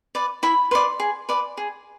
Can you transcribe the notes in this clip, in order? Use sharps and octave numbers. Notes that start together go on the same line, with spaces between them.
B4 D5
E4 B5
B4 D5 C6
G#4
B4 D5
G#4